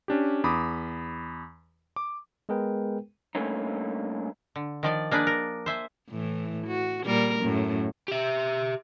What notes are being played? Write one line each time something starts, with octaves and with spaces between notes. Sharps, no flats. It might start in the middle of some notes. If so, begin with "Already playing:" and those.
C#4 D4 G4
E2 B5 D6 D#6
D6
G#3 B3 G#4 A#4 B4 G5
G2 A3 A#3 C#4 D#4
D3
D#3 F3 D5
A#3 D4 G#4 B4 D5
A#4
C5 E5 G#5
A2 E3
F#4
A#2 G3 A#4
F#2 A2
G4 E5